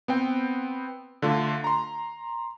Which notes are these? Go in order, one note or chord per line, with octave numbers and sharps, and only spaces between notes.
B3 C4 G5
D3 A3 F4
A#5 C6